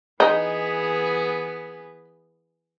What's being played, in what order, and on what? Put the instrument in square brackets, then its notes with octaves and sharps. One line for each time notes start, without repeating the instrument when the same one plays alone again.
[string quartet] E3 B3 G#4 [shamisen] D#4